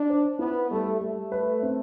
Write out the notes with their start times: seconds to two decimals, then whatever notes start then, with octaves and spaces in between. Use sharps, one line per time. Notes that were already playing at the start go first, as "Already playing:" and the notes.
Already playing: D4
0.10 C5
0.39 B3 E4
0.70 G3 A3
1.01 G3 A3
1.32 B4
1.62 C4